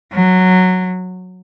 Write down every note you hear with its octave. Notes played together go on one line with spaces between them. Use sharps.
F#3